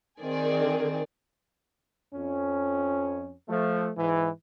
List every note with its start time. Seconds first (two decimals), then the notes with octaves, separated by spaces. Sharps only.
0.21 D#3 C4 G#4 D5
2.14 F2 C#4
3.48 F3 A3
3.97 G#2 E3